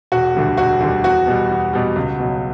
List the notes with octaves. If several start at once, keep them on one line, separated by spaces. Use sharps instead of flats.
E1 F#4
D2 D3 G3
E1 F#4
D2 D3 G3
E2 F#4
B2 G3
E2
B2 G3
C#2
B2 F#3